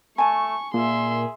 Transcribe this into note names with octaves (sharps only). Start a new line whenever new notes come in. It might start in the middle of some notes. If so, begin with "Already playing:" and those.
A3 G#5 A5 C#6
A#2 G#4 E5 C6